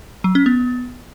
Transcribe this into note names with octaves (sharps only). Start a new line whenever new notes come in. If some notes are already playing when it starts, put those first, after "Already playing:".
F#3
C#4
B3